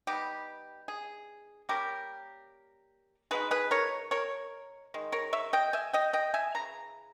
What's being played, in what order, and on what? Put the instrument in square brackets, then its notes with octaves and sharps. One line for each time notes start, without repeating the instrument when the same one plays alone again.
[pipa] G3 B3 D#4 G4
G#4
G3 A#3 C#4 G4 A#4
B2 G#3 D#4 G#4 B4
G#4 B4
A#4 C#5
A#4 C#5
D#3 G#3
A#4 C#5
C#5 E5
D#5 G5
E5 G#5
D#5 G5
D#5 G5
E5 G#5
C#3 E3 A#5